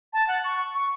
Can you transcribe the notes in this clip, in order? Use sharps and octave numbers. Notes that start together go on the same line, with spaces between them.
A5
F#5
C#6
C#6